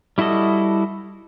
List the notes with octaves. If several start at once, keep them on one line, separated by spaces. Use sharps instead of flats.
G3 E4 F#4 A4 D#5